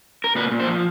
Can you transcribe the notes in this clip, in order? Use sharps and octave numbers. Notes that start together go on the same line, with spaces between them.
A#4
A#2 B4
A#2
C5
F3